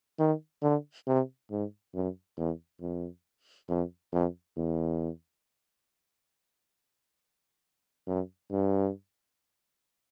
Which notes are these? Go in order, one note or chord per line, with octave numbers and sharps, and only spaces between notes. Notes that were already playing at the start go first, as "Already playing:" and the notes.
D#3
D3
C3
G#2
F#2
E2
F2
F2
F2
E2
F#2
G2